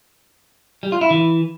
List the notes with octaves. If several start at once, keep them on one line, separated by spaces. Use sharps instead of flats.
G3
F4
E4
E3